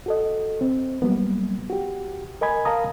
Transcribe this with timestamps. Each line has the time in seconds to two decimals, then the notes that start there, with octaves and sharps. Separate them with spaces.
0.06 F#4 A4 D#5
0.61 C4
1.02 F#3 G3 A#3 B3
1.70 F#4 G4
2.41 A#4 D#5 G#5 B5 G#6
2.65 A#4 F5 A5 A#5 D#6